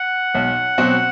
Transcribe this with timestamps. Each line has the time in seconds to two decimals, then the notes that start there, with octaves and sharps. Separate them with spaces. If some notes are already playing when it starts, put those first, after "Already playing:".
Already playing: F#5
0.35 B1
0.78 B2 F#3 C4 F#4